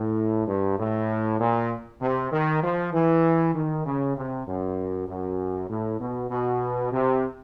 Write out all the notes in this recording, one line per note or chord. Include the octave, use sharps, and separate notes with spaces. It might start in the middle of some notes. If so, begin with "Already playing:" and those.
Already playing: A2
G2
A2
A#2
C3
D#3
F3
E3
D#3
C#3
C3
F#2
F#2
A2
B2
B2
C3